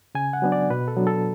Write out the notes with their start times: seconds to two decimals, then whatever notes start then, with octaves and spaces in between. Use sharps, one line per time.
0.15 C#3 G#5
0.33 F#5
0.42 F#3 B3 D4
0.52 D5
0.70 B2 B4
0.88 A4
0.97 F#3 B3 D4
1.07 A4